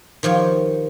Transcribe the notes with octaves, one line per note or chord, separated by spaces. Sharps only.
D#3 F3 G4 C#5